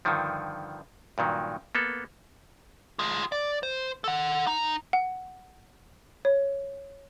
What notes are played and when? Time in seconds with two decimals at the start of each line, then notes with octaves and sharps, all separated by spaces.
0.05 G2 D3 D#3 F3
1.18 G2 A#2 D#3 F#3
1.75 A#3 B3 A4
2.99 F4 G#4
3.32 D5
3.63 C5
4.04 A4 F#5
4.47 D#4
4.93 F#5
6.25 C#5